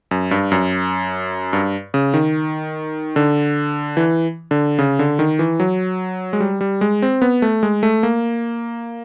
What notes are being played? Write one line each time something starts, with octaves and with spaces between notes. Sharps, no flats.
F#2
G2
F#2
G2
C#3
D#3
D3
E3
D3
C#3
D3
D#3
E3
F#3
G#3
G3
G3
G#3
C4
B3
A3
G#3
A3
A#3